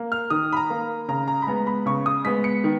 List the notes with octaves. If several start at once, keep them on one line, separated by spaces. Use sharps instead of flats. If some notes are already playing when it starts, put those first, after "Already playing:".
Already playing: A#3
F6
D#3 D#6
B5
A#5
A#3
C#3 A#5
A#5
B5
G#3 B3 A#5
B5
C#3 C#6
D#6
G#3 B3 B6
C#7
D#3